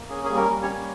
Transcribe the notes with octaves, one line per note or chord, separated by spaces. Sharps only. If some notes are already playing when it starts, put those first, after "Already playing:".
Already playing: A#3
C#4 G#4
G#4
G3
A#3 A#4
G3
C#4 C#5
A#3